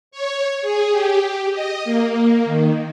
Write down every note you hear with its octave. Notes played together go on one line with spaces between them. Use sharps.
C#5
G#4
G4
D#5
A#3
D#3